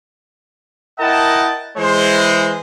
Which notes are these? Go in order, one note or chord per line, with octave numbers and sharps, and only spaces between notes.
E4 A#4 D#5 F#5 G5 A5
E3 G#3 C5